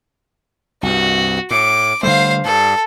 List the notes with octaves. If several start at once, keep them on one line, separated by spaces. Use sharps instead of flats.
C2 G2 F#4
A2 D6
D3 G3 A3 C5 F5
G2 A4